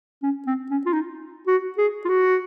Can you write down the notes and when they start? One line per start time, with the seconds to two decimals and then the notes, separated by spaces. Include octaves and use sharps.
0.23 C#4
0.47 C4
0.70 C#4
0.86 F4
0.93 D#4
1.47 F#4
1.78 G#4
2.05 F4
2.09 F#4